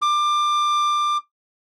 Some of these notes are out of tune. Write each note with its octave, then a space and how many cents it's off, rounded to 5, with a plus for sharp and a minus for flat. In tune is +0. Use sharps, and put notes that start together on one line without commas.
D6 +20